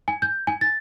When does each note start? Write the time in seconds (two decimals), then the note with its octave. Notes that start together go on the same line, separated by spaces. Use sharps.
0.08 G#5
0.22 G6
0.47 G#5
0.61 A6